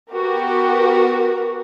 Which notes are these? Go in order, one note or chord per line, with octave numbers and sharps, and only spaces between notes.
B3 F#4 G4 A#4